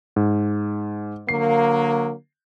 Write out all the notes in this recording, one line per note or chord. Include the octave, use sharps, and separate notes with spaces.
G#2
D3 F#3 A#3 C7